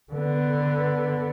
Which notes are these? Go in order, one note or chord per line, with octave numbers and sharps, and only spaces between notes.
D3 B3